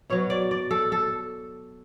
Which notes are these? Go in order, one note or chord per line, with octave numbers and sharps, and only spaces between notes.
B2 F#3 C#5
D5
D5
A4
A4